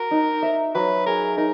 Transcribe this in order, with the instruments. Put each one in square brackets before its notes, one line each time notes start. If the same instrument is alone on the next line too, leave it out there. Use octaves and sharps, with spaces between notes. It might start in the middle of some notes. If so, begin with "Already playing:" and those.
Already playing: [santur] F#4 [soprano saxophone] A#4
[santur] D#4
E5
[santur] F#3 [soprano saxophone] B4
[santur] G#4 [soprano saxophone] A#4
[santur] D#4 [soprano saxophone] A#4